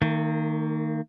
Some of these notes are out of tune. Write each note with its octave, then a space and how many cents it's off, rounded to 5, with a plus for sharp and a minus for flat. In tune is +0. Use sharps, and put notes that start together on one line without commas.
D#3 +0 A#3 -40